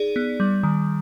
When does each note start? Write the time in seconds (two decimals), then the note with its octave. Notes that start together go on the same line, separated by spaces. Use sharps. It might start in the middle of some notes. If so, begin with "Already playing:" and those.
Already playing: D#4 G#4 D5
0.16 B3
0.40 G3
0.63 D#3